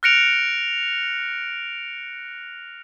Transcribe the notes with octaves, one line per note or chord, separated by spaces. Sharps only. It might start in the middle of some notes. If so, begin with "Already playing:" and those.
F6 F#6 A#6 C#7 D7 F7